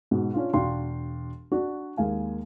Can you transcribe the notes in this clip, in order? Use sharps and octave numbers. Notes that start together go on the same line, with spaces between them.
G#2 B2
C#4 D4 F4
E1 D4 F#4 F5 G5 C6
D4 F#4 D5
D#2 G#3 A#3 F5 G#5